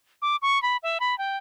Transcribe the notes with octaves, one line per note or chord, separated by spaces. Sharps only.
D6
C#6
B5
E5
B5
G5